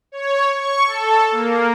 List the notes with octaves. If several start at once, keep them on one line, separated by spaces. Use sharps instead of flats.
C#5
C#6
A4
A#3